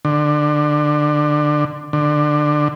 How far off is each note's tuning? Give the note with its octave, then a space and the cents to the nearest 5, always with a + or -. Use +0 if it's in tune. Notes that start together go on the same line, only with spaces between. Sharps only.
D3 +20
D3 +20